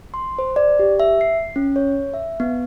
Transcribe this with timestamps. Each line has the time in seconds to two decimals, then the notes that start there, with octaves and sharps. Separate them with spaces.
0.14 C6
0.39 C5
0.56 D5
0.79 G4
1.00 E5
1.21 C7
1.56 C#4
1.76 C#5
2.14 E5
2.40 B3